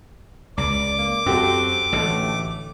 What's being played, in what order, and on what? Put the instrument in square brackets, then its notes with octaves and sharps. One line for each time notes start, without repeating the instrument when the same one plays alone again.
[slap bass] C#2 [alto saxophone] D5 [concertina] D6
[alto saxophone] A#3
[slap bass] F#2 [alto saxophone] C4 [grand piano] F#4 G4 A4
[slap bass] A1 D3 [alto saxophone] A3